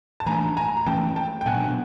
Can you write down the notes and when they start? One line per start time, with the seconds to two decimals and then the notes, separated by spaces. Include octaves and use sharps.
0.20 A5
0.26 E3 A3 D4 G#5 A#5
0.57 G#5 A#5
0.77 A#5
0.86 E3 A3 C#4 G5 A5
1.16 G5 A5
1.41 G5
1.46 B2 F#3 B3 D4 F#5 G#5